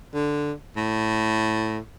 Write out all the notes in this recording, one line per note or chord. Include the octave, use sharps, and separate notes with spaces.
D3
A2